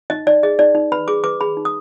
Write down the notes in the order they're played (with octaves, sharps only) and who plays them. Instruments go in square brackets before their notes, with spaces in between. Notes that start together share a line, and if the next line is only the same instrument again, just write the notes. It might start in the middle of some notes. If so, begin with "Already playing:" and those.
[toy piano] D#4 D#5
D#4 D5
G#4 D#5
D#4 D5
D#4
B4 B5
G#4 D6
B4 D6
G#4 B5
D#4
D#6